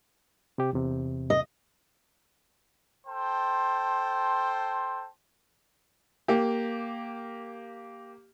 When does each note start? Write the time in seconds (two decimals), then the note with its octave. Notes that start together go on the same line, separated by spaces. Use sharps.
0.58 C3 G4
0.73 E2 C3
1.30 D#5
3.07 A4 C5 G5 A5 C6
6.28 A#3 G4